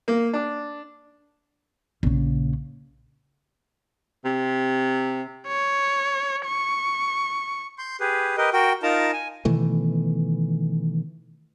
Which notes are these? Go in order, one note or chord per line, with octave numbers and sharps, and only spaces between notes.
A#3
D4
A#1 C#3
C3
C#5
C#6
C6 G6
G4 G#4 B4
G4 A#4 B4 D#5
F#4 A#4 G5
D#4 F4 A#4 A5 A#5
G#5
B2 D#3 E3 A3